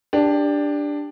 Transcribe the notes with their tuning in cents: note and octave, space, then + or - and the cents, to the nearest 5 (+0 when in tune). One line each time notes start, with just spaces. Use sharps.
D4 +0 G4 +20